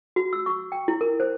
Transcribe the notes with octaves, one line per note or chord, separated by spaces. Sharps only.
F#4
E6
C#6
G5
E4
A#4
C5